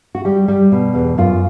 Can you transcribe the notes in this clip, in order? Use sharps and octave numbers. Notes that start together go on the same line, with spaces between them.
F#4
G3 G4
G3
B2
E2
F#2 F4